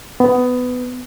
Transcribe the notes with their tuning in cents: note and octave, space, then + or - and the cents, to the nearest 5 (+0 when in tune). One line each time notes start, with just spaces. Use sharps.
B3 +15